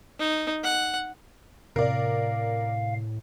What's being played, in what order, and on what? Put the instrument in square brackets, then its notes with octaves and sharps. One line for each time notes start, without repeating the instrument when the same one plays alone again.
[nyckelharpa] D#4
F#5
[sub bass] A2 [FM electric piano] C3 [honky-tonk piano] A#4 D5 [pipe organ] F5